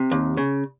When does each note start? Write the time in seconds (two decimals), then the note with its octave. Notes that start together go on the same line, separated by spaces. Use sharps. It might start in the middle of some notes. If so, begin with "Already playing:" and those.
Already playing: C3
0.11 D#2
0.37 C#3